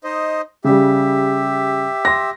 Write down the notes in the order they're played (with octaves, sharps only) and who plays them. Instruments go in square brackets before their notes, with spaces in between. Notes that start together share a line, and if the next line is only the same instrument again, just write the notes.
[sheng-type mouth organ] D#4 C5 D#5
[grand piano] C#3 G3 [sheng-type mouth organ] G4 E5
[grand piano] C6 A#6